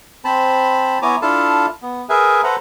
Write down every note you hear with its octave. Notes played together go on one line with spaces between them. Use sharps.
C4 C5 A5 B5
B3 E4 C#5 G#5 A#5 D6
D4 E4 F4 A4 F5 A5
B3
G#4 A#4 B4 E5 G#5
A4 B4 C5 F#5 A#5